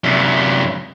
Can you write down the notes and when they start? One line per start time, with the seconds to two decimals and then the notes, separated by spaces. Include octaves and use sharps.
0.04 F#2 C3